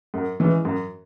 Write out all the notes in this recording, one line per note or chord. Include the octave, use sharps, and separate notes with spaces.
F#2
E3 G#3 C#4
F#2